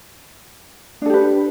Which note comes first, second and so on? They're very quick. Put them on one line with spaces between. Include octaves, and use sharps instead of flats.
D4 A4 G4 B4